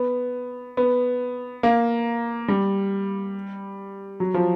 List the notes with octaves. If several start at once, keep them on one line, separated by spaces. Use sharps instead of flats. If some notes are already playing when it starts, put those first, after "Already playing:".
Already playing: B3
B3
A#3
G3
F#3
F3